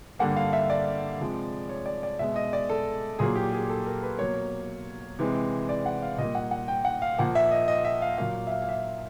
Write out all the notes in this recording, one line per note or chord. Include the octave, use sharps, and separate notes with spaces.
G2 D3 G3 A#3 F#5
F5
E5
D5
C3 F3 G#3
C#5
D5
D5
B2 G#3 E5
D#5
D5
A4
A#2 F#3 A#3 G#4
G4
G#4
A4
A#4
B4
B2 F#3 A#3 C#5
C3 E3 G#3
D5
F#5
F5
A#2 G3 A#3 D#5
F#5
F#5
G5
F#5
F5
A#2 F3 A#3 F#5
E5
D#5
D#5
E5
F5
A#2 F#3 A#3 F5
E5
F5
F5
E5